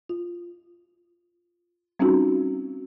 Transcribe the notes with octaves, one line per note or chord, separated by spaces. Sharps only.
F4
G3 C4 C#4 D#4 F4 F#4